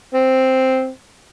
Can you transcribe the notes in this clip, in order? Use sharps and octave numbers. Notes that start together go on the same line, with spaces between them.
C4